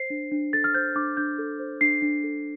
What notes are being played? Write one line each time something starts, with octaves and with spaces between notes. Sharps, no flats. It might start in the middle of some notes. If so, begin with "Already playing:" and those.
Already playing: C5 C7
D4
D4
A4 A6
F6
C5 G6
D4 D6
D4 G6
A4
C5
D4 C7
D4
A4